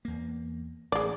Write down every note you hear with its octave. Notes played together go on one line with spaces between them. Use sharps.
E2 A#3
A1 G#3 D5